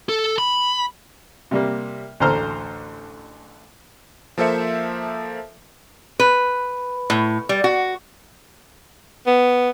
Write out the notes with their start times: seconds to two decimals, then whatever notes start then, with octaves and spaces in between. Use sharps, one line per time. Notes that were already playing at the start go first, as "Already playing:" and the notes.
0.09 A4
0.38 B5
1.51 C3 G3 A#3
2.20 A1 D2 D3 C5 A#5 F6
4.38 F3 A#3 A4 C5 E5 C#7
6.19 B4
7.10 A2
7.49 G3
7.64 F#4
9.27 B3